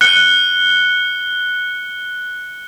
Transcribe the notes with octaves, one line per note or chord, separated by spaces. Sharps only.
F#6 C#7 G7